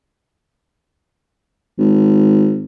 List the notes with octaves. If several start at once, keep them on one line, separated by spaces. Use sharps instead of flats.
G#1